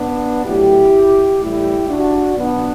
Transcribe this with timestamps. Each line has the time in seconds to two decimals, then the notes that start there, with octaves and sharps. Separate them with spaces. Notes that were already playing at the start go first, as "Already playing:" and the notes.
Already playing: B3 D4
0.45 A2 F#3 E4 G4
1.41 A2 E3 G3 E4 G4
1.89 D4 F#4
2.38 B2 F#3 B3 D4